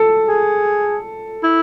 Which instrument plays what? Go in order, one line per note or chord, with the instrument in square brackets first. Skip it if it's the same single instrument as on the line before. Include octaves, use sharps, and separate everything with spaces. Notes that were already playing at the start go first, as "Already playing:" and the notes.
Already playing: [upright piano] A4
[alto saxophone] G#4
E4